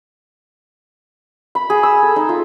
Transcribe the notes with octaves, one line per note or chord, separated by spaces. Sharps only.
B5
G#4
E6
A4
D#4
F4